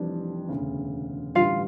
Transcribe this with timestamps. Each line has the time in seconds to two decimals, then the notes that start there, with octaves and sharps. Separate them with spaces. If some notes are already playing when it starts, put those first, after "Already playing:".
Already playing: F1 F2 E3 G3 D4
0.49 E1 D2 C#3
1.35 A1 G2 D3 G3 F4 F5